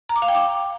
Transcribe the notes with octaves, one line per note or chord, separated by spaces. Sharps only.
A#5
D6
F5
G5
D6